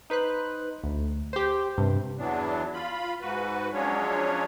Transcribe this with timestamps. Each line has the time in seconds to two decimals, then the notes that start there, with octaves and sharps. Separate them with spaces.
0.10 D#4 B4 C5 F#6
0.84 D2
1.33 G4 C5
1.78 G2 C3
2.18 E2 E3 F#3 B3 D4
2.74 F4 B5
3.21 G#2 F#4 B4
3.73 F3 F#3 G#3 C#4 D4 C#5